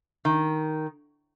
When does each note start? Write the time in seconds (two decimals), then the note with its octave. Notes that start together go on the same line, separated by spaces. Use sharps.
0.25 D#3